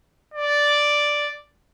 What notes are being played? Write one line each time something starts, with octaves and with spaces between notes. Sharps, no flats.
D5